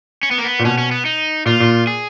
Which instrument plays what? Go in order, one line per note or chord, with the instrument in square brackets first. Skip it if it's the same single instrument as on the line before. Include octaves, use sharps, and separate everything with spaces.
[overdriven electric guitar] C#4
B3
A#3
B3
[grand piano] A#2
[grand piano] B2 [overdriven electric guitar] C#4
[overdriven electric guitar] C#4
B3
D#4
[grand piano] A#2 [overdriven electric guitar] F4
[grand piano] A#2
[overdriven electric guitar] G#4